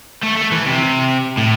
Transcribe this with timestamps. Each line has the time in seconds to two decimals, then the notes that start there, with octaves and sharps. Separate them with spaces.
0.23 A3
0.37 A3
0.52 E3
0.66 C3
1.37 A2